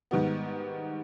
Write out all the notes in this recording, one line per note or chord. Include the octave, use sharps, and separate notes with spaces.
G#2 D#3 G3 B3